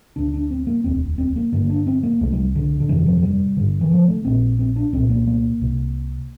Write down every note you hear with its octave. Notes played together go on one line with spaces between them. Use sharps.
D2 D3 D4
D4
C4
A#3
E1 D2 D3 C4
C4
A#3
G1 G2 D3 A#3
D4
C4
A#3
C2 C3 A3
G3
D3
D3
G1 F2 C3 E3
F3
F3
G3
G1 G2 D3
E3
F3
A3
A#1 A#2 C4
C4
D4
C2 A#2 C4
A#3
A#3
C2 C3